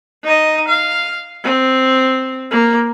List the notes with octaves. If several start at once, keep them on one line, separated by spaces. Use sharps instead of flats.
D#4 D#5
F5
C4
A#3